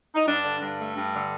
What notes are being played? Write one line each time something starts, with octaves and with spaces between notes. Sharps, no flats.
D#4
G2 D4
D3
G2
A3
G2
D3